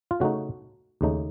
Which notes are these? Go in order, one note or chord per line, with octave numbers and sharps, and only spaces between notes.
F4
C#3 A3 D#4 F#4
D#2 C#3 A3 D#4